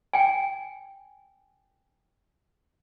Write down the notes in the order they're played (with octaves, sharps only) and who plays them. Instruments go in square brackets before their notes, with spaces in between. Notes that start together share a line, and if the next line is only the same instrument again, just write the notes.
[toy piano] G5 G#5